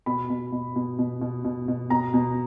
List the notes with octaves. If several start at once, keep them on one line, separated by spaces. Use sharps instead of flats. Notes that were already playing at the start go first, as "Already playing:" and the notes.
B2 B5
B2
B2
B2
B2
B2
B2
B2
B2 A#5
B2